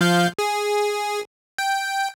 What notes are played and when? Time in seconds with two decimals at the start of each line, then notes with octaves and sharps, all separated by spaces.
0.01 F3 F5 G6
0.39 G#4
1.58 G5